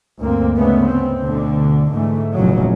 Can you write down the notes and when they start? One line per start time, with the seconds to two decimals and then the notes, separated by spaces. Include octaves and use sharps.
0.20 D2 G2 A#3 C4
0.56 G#2 C#3 G#3 A3 B3
0.86 B3 C4
1.21 D2 B2 D3
1.90 G#2 D3 E3 A3
2.34 F1 E2 A#2 C#3 F#3